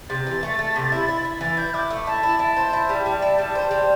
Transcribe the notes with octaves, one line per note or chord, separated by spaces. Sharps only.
C3 A6
E3
A3
A3
C3
E4
E4
E4
E3 A6
E4 G6
E4 D6
A3
E4 A5
E4
E4 A5
C5
E4 A5
G3
G3
E4
G3
C5
G3